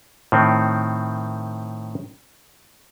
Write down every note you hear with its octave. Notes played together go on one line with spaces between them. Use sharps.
A2 D#3 C4